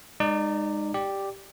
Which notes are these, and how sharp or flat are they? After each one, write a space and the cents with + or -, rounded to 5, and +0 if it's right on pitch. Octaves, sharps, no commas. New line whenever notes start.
G#3 -15 D#4 -25 D5 +0
G4 +0 D5 +0